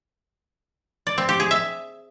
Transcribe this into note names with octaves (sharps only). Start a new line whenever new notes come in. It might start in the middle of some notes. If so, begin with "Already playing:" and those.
D5
C4
G4
G#4
E5